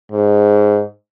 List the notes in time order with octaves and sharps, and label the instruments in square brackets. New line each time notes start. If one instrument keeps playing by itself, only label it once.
[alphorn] G#2